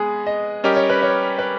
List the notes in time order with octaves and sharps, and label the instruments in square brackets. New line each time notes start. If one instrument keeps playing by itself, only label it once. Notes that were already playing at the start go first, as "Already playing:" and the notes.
Already playing: [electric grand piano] G#3 B3 [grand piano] G#4
[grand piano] D#5
[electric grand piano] G3 C#4 G4 A#4 [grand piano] D#5
[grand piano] C#5
B4
C#5
B4